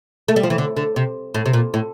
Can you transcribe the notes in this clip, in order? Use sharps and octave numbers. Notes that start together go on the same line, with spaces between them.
A3
G3
F3
E3
D3
D3
C3
A2
C3
A#2
A2